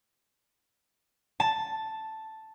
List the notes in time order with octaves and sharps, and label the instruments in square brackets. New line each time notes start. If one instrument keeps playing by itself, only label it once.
[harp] A5